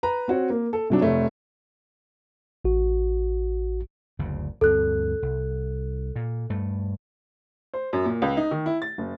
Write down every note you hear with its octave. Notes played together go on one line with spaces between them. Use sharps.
B4 A#5
C4 F#4 C#5
A#3
A4
C3 F#3 D4
F1 A3 C#5
A1 F#4
F#1 D2 C#3
D2 G2 C4 A4 F#6
C2
A#2
G2 A3
C5
F#2
A#2
C#2
D#4
D#3
E4
A6
F#1